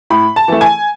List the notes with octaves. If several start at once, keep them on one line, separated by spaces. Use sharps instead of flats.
A2 B5
A5
E3 A3
G#5